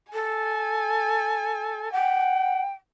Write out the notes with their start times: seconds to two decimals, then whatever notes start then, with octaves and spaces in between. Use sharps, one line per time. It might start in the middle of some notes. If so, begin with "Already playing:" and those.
0.13 A4 G#5
1.92 F#5 G5